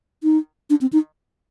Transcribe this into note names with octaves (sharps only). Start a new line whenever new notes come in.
D#4
D4
C4
D#4